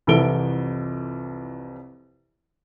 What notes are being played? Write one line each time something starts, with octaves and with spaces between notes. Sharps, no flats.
C2 F2 E3 A4 D7 G7